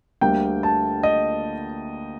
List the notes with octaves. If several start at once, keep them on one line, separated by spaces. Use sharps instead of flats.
D2 D3 G3 A#3 G5
A5
D#5